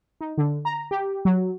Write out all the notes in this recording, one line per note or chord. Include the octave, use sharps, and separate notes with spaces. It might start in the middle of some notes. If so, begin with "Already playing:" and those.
D#4
D3
A#5
G4
F#3